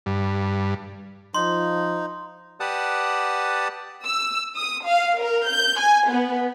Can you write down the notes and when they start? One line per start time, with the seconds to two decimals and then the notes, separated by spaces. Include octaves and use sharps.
0.06 G2
1.35 F3 D#4 C6
2.60 G4 B4 D5 F#5 A5 D#6
4.04 E6
4.56 D#6
4.87 F5
5.18 A#4
5.48 G6
5.79 G#5
6.09 B3